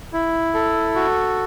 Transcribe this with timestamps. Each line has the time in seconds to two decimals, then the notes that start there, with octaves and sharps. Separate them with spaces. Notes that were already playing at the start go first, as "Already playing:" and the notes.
0.13 E4
0.54 A4
0.95 F#4